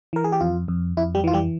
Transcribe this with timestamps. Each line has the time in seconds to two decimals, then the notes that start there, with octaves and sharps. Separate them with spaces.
0.13 E3 A#4
0.24 G#4
0.32 G4
0.41 F2 F4
0.68 F2
0.97 F2 E4
1.15 G3 G4
1.24 E3 F4
1.33 G3 G4